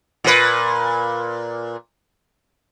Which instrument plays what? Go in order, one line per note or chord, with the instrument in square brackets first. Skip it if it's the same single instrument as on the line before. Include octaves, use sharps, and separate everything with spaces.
[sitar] A#2 B4